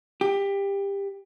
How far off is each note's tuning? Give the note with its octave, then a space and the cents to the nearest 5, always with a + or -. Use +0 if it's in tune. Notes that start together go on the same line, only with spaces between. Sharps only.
G4 +20